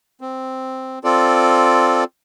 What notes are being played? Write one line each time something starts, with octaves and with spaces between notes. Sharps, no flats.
C4
C4 F4 A4 D5